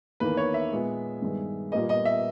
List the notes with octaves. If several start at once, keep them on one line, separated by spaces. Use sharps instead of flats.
E2 D#3 A#3 B4
C#5
E5
A#2 G#3 B3
G2 D#3 G#3 B3
A#2 G3 A#3 D#5
D#5
E5